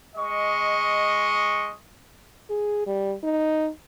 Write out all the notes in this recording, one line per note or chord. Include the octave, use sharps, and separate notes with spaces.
G#3 D#5 C#6
G#4
G3
D#4